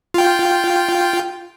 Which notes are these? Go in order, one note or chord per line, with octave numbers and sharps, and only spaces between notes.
F4 G5